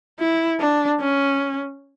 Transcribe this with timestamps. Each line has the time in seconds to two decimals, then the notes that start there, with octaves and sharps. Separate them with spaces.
0.20 E4
0.60 D4
1.01 C#4